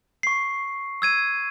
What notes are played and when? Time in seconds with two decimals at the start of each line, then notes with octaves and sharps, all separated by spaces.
0.23 C#6 C7
1.02 E6 G#6 D#7